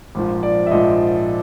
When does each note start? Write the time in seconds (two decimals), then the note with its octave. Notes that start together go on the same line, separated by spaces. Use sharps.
0.15 A#1 G#2 F3
0.43 D5
0.66 E5
0.71 A#1 G#2 F3 D#5